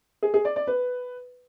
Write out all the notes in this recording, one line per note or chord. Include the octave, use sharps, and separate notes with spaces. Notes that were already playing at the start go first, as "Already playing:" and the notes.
G#4
G#4
D5
D5
B4